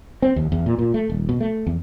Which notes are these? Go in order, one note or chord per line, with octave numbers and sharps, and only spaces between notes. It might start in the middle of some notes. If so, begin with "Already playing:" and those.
C4
D#2
E2
A#2
A#2
A3
D#1
B2
A3
E2